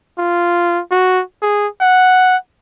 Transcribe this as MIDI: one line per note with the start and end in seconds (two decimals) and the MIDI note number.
0.18 0.81 65
0.91 1.22 66
1.42 1.67 68
1.81 2.37 78